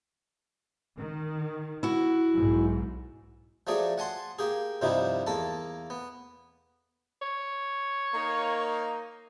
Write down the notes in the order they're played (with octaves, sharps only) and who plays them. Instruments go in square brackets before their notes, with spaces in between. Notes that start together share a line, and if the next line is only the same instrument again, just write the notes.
[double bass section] D#3
[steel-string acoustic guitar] E4 F#4
[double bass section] B1 G#2
[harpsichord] F3 F#3 A3 G#4 D5
F#5 G#5 A5 C6
A#3 G4 G#4
G2 C3 F3 G3 D#4 E4
E2 A#3 A4 A5
B3
[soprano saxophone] C#5
[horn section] A#3 D#4